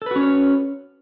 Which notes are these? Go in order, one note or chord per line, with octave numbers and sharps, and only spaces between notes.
C#4 F#4 A4 B4 C#5